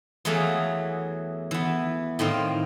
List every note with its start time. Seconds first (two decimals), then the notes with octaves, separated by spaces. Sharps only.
0.25 E2 E3 F#3 A3 G#4 F5
1.51 E3 B3
2.19 A2 D#3 C4 F5